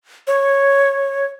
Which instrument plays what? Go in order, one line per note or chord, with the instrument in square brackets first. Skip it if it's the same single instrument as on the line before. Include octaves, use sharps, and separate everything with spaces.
[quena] C#5